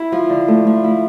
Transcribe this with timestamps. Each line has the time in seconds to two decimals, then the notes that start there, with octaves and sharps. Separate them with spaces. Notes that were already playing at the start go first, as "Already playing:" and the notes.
Already playing: E4
0.12 F3
0.30 D3
0.48 A3
0.67 F3
0.84 E4